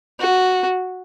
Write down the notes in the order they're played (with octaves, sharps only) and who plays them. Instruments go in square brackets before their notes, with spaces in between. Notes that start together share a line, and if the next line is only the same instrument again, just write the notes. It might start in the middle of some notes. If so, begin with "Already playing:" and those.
[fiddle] F#4